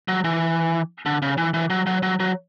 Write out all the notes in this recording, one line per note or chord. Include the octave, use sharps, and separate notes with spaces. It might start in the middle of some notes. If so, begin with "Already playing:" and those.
F#3
E3
D3
C#3
E3
E3
F#3
F#3
F#3
F#3